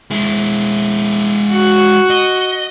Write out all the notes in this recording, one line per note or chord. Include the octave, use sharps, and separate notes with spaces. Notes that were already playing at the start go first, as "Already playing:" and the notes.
G#3 E4
F#4
D#5